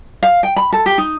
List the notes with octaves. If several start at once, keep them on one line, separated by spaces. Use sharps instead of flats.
F5
G5
B5
A4
G4
D#4